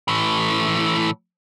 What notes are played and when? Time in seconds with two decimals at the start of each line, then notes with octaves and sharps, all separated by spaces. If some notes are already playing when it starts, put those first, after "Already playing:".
0.08 A2 E3